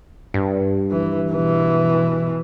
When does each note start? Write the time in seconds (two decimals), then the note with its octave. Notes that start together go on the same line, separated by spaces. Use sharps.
0.34 G2
0.91 E3
1.31 B2 E3